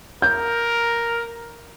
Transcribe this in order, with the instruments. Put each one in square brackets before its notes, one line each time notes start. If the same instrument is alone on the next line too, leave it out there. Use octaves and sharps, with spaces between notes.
[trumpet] A#4 [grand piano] G6